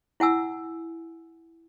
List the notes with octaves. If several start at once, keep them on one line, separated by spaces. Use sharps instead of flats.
E4 F#5 G#5 E6